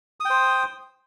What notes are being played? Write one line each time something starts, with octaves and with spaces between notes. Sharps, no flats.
C5 G5 D#6